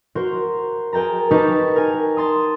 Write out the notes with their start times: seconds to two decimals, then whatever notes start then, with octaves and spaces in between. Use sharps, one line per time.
0.15 F#4 A#4 C5
0.93 G#4 A#4 G5 A5 A#5
1.31 D#4 G4 A#4 B4 A5 C#6
1.76 A#4 G#5
2.17 A5 C6 D#6